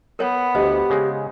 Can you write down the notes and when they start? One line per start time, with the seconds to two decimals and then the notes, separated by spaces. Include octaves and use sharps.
0.19 B3 A#4 C#5 F#5
0.55 D2 G4 C5 D#5
0.90 C#3 G#3